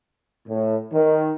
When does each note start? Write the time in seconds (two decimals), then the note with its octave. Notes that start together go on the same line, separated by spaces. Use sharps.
0.48 A2
0.94 D#3